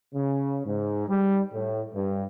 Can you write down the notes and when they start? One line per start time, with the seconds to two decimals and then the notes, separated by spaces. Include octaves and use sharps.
0.14 C#3
0.66 G#2
1.08 G3
1.52 A2
1.94 G2